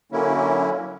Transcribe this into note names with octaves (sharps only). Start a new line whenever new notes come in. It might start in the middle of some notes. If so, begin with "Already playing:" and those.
D3 F#3 A#3 C#4 E4